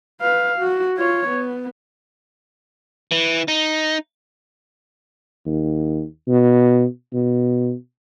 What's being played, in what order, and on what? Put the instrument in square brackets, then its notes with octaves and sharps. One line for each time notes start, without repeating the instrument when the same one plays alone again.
[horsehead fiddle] B4 F5
F#4
F4 C#5
B3
[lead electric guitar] E3
D#4
[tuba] D#2
B2
B2